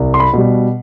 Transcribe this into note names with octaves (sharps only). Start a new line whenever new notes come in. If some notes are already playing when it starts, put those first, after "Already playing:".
Already playing: C2
C6
B5
B2 G3